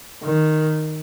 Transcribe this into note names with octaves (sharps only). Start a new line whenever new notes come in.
D#3